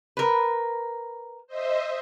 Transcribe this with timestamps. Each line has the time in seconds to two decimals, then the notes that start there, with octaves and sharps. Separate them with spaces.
0.17 A#4 B4
1.47 C5 D#5 E5